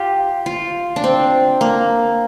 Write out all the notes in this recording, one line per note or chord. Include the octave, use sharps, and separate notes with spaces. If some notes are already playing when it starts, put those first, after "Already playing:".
Already playing: F4 G4
F4
D4
C4
A#3